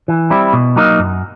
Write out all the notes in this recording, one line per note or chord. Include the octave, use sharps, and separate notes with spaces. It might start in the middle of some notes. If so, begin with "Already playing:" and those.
E3
G3 C4 E4
B2
F#3 A#3 D#4
F#2